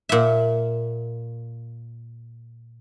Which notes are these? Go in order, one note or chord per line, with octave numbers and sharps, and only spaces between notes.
A#2 E5